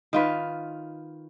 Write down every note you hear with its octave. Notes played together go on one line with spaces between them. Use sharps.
D#3 F4 B4